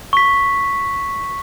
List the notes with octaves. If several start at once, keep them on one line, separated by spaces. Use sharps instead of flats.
C#6 B6